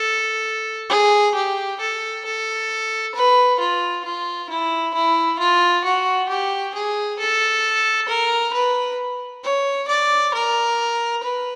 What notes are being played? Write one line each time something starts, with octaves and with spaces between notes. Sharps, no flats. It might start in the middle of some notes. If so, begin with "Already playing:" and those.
Already playing: A4
G#4
G4
A4
A4
B4
F4
F4
E4
E4
F4
F#4
G4
G#4
A4
A#4
B4
C#5
D5
A#4
B4